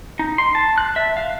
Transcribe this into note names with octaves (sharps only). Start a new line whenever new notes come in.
D#4
C6
A5
F#6
E5
F5